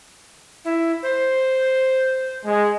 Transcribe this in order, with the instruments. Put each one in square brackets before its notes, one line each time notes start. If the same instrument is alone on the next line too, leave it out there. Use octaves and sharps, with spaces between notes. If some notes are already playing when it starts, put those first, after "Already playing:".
[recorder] E4
C5
[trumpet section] G#3